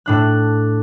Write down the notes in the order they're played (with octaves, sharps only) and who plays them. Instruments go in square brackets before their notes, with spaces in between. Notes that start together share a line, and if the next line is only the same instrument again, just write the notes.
[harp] A2 D4 F#6